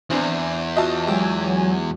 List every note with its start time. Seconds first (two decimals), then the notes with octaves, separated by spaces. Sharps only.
0.10 E2 E3 C4 D4
0.77 F4 F#4 D#5 E5 A5
1.07 F#3 G#3 G4 G#5 D6 E6